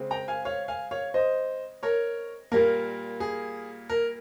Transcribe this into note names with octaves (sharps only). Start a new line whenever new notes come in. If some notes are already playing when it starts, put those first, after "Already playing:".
Already playing: C#3 G#3 C4
G5 A#5
F5 G#5
C#5 F5
F5 G#5
C#5 F5
C5 D#5
A#4 C#5
A#2 G3 A#3 A#4
G#4
A#4